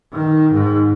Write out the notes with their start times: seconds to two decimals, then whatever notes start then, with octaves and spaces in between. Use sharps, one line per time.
0.14 D#3
0.53 G#2